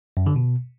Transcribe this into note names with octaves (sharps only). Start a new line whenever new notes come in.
F#2
D3
B2